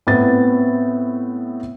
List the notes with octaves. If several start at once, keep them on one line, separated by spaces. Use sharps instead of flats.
A2 B3 C4 A6